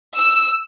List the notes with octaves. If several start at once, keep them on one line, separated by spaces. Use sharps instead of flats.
E6